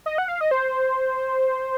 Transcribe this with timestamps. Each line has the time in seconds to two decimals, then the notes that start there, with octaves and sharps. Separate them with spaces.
0.06 D#5
0.18 F#5
0.28 F5
0.41 D#5
0.51 C5